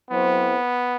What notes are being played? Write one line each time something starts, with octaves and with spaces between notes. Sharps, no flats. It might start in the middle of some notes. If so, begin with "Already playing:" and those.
F#3 B3 C4 E4 A4 C5